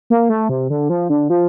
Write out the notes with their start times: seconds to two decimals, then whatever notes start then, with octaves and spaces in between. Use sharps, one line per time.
0.10 A#3
0.30 A3
0.49 C3
0.70 D3
0.90 F3
1.10 D3
1.30 F3